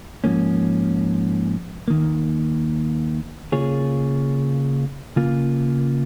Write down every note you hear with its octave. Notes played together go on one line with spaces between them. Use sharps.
G#2 F3 A#3 C#4
D#2 D#3 A#3
C#3 A#3 F4 G#4 C#5
C#3 A#3 F4